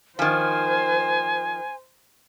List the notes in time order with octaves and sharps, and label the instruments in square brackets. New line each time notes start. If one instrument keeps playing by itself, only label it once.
[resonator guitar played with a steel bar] D#3 F3 [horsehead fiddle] C5 [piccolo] G#5